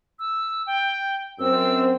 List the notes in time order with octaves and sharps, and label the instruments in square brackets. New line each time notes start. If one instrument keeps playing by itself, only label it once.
[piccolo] E6
G5
[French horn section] F#2 C4 [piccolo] E6